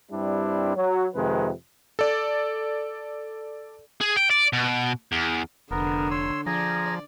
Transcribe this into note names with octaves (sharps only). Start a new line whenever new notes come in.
G2 G3 C4 D4 E4
F#3
F2 C3 D#3 G#3 B4
A4 D5
G#4
G5
D5
B2
E2
F1 D3 B3 A#4
C#5 C6 E6
F3 G#4 D5 A#5